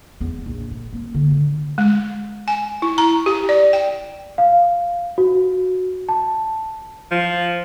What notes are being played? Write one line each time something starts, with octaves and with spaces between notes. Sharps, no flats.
E2 B3
A#1
A2
A#3 C4
D3 F4
D3
G#3
G#5
E4
A#5
G4
D5
G5
F5
F#4
A5
F3